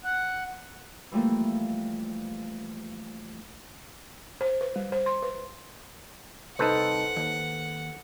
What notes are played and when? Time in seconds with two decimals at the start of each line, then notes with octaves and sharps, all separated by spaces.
0.04 F#5
1.12 E3 F3 G3 A3 A#3
4.41 C5
4.61 B4
4.76 G3
4.92 C5
5.06 C6
5.23 B4
6.59 C2 D#4 A4 B4 C5 F#5
7.16 D#2